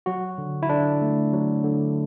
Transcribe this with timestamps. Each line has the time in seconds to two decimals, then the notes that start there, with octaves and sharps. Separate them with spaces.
0.06 F#3 F#4
0.38 D3
0.63 E4
0.69 D3 D4
1.02 A3
1.33 F#3
1.64 D3